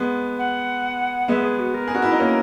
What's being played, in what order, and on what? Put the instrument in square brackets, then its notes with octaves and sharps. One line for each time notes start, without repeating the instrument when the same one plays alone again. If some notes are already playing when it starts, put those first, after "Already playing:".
Already playing: [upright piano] G#3 B3
[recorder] F#5
[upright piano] G#3 B3 [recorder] E5
[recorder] G#4
F#4
A#4
[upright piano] G#4
F#4
E4
D#4
A#3 C#4